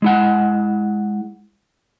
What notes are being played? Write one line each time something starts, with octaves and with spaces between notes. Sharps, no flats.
G#3 E4 F#5